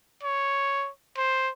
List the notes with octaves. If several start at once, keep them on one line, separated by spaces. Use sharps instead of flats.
C#5
C5